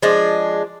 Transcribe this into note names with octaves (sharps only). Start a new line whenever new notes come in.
F3 G#3 D4